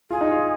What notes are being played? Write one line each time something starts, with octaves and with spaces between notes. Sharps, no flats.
F4 G#4
D#4
F4